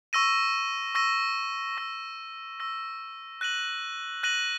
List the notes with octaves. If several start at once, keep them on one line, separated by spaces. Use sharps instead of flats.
C#6 E6 A#6 D#7
C#6 E6 A#6 D#7
C#6 E6 A#6
C#6 E6 A#6
F#6 A#6 D#7 F#7
F#6 A#6 D#7 F#7